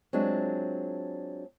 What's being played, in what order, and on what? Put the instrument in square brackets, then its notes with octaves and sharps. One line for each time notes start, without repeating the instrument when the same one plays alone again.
[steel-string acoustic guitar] F#3 G#3 C4 D4 F4